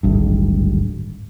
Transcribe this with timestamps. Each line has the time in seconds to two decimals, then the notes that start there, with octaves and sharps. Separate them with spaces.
0.03 D1 G#1 G2